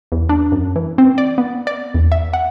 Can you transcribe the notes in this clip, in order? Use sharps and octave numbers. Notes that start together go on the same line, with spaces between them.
E2
D4
F#2
E3
C4
D5
B3
D5
E2
E5
F#5